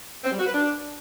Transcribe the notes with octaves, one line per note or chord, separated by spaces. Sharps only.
C4
G3
F#4
B4
D4